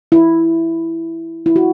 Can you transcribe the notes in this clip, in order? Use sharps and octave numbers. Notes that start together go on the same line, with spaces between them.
E4
E4
F#4